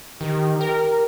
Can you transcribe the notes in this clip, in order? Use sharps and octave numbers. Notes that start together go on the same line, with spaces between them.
D#3 G4
A#4